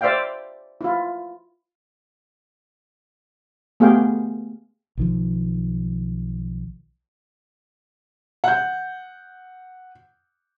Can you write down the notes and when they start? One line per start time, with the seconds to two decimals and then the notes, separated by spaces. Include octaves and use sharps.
0.01 C5 D5 E5 F5 G5
0.81 E4 F4
3.80 A3 B3 G4 G#4 F5 G5
4.97 B1 D#3 F3
8.44 F#5 G6